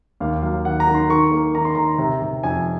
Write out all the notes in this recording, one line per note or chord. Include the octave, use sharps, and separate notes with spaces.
D#2 F5
F#3 F5
D#3 F#5
A#5
D#3
C6
D#3 C#6
A#3
D#3 A#5
C6
D#3 A#5
C3
C3
F2 G#5